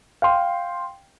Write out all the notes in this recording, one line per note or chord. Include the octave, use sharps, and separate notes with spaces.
F5 G5 C6